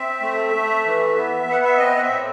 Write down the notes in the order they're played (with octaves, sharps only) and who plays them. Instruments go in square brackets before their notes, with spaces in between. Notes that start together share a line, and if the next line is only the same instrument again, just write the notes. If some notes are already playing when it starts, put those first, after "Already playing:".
Already playing: [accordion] C4 E5
A3
A3
E3
B3
B3 F#5
E5
C4 D#5
F#5
E5
A2